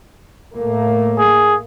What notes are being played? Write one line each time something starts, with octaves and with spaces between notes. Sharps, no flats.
A2 A3 A#3
G#4